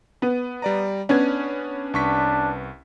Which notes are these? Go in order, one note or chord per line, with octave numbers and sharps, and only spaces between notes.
B3
G3 D5 A#5
B3 C#4 D4 G#6
C2 D4 C#6 B6